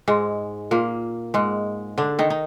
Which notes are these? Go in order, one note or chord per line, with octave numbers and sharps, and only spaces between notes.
G#2 G#3
A#2 A#3
G#2 G#3
D3 D4
D#3 D#4
D#4